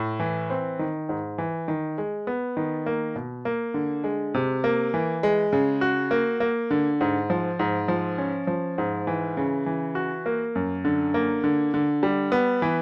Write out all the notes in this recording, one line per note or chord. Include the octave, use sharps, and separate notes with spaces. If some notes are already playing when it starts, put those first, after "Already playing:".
Already playing: A2
E3
C4
D#3
G#2
E3
D#3
G#3
B3
D#3
A#3
B2
A#3
D3
G#3
C3
A#3
E3
G#3
C#3
F#4
A#3
A#3
D3
G#2
F3
G#2
F3
C#4
F3
G#2
E3
C#3
E3
F#4
A#3
F#2
D3
A#3
D3
D3
G3
B3
E3